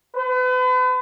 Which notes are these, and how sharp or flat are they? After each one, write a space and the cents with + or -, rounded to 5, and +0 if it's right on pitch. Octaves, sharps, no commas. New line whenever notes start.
B4 +40